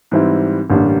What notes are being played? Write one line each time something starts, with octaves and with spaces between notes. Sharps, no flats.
G#2 E3 G3 C4 E4
A1 G2 D3 G3 A#3